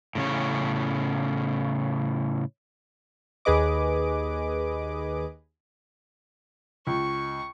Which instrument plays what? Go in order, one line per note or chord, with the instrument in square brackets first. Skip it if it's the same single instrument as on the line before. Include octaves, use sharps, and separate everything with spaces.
[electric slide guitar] A2 C#3 C#4
[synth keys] D#2 G#4 B4 D#5 D6
[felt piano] C#2 [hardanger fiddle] C#6